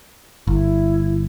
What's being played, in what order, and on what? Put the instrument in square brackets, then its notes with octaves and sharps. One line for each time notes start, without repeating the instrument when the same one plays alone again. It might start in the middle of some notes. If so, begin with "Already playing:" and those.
[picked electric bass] G1 [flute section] E4